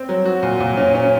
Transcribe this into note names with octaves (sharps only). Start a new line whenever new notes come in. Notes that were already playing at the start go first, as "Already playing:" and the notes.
Already playing: C4
F#3
F#4
A#2
A#2
C#4
C#4